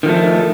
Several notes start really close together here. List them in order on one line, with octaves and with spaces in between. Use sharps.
D#3 F3 A3